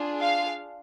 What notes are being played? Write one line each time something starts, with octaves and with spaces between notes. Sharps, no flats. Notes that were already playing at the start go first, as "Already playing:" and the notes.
Already playing: D4 F4 G#4
F5